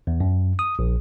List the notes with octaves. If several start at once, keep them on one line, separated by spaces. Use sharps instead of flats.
E2
F#2
D#6
A#1